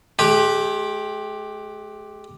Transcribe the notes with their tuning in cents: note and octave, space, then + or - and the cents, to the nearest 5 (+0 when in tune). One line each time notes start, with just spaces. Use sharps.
G#3 +40 G4 +0